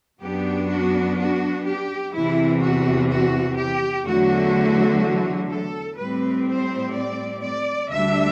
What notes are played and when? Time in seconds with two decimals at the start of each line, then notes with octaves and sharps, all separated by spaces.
0.21 F#2 F#3 B3 D4 G4
0.70 F#4
1.18 F#4
1.66 G4
2.14 E2 C3 E3 E4
2.62 F#4
3.10 F#4
3.58 G4
4.06 E2 D3 F#3 A3 F#4
5.50 A4
5.97 A2 G3 C4 B4
6.46 C5
6.94 D5
7.42 D5
7.90 D2 D3 G3 D4 E5